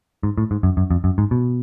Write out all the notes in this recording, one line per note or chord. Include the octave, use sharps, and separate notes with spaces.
G#2
A2
G#2
F#2
F#2
F2
F#2
G#2
B2